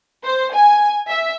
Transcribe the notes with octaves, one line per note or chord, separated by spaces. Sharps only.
C5
G#5
E5